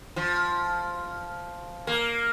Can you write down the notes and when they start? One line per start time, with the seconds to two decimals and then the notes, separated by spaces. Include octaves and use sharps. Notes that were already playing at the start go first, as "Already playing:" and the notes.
0.16 F3
1.87 A#3